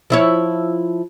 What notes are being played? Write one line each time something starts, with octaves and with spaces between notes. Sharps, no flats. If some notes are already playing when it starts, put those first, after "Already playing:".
F3 E4 C#5